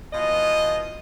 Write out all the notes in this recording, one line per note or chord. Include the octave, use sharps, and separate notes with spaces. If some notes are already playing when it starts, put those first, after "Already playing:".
B2 E3 F4 D#5